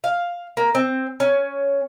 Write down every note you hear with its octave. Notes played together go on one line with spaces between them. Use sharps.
F5
A#3
C4
C#4